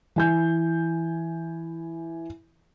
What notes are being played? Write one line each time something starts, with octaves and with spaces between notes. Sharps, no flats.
E3 G#5 G6